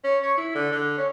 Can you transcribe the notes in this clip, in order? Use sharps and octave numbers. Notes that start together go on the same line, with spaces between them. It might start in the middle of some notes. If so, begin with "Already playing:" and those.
C#4
C#5
E4
D3
D3
C#4